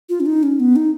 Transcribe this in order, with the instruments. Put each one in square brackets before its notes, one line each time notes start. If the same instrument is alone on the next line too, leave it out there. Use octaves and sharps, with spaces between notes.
[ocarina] F4
C#4
D#4
C#4
B3
D#4